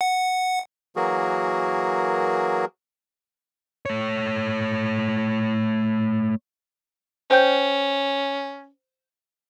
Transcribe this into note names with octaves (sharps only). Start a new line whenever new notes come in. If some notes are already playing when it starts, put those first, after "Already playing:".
F#5
E3 F#3 A#3 F#4 G#4 A#4
A3 C#5
C#4 C5 G5 G6